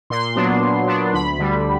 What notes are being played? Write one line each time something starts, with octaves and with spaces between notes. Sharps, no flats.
A#2 C6
F#3 B3 D4
A#2
F#3 B3 D4
D2 B5
D3 G3